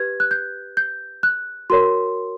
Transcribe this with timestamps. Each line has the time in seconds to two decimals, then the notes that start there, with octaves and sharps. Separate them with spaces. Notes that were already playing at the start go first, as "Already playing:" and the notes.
Already playing: G4 B4 G#6
0.20 F#6
0.31 G6
0.77 G6
1.23 F#6
1.70 F#4 A#4 C#5 C6